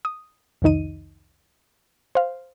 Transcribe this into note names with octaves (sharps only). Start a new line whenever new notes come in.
D#6
C2 F2 D#3 D#4 D#7
C5 F5